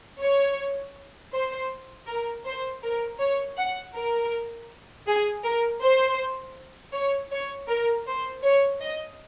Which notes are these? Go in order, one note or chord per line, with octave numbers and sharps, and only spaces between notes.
C#5
C5
A#4
C5
A#4
C#5
F#5
A#4
G#4
A#4
C5
C#5
C#5
A#4
C5
C#5
D#5